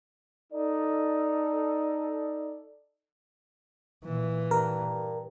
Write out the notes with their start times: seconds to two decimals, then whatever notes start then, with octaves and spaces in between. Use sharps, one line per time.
0.53 D#4 A4 D5
4.04 A#2 E3
4.51 G2 A#4